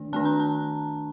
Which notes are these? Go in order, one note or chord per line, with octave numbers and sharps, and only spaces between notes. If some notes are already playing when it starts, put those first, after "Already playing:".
Already playing: D#3 A3 D4
D#3 A3 D4 A5
A#5
A5